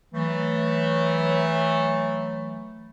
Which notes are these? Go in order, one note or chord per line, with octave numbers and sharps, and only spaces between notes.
E3 F#3 A3